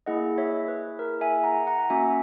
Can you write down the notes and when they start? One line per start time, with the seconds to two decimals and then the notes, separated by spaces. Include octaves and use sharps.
0.06 A#3 E4 G#4 D#5 F#5
0.38 C#5 E5
0.68 B4
0.99 A#4
1.21 E5 G#5
1.44 F#5 A#5
1.67 F#5 A#5
1.79 F#5
1.90 A#3 C#4 F#4 E5 G#5